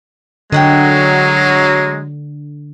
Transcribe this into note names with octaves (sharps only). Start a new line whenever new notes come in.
D3 F#3 G#3 D#5 F#5 G5